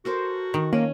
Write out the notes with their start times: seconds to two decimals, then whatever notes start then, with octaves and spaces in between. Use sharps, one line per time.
0.05 F#4 A4 A#4 C5
0.54 D#3
0.73 A#3 C#4